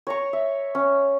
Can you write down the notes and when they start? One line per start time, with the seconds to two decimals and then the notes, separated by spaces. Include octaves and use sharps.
0.07 C#5 A#5 C#6
0.33 E5
0.75 C#4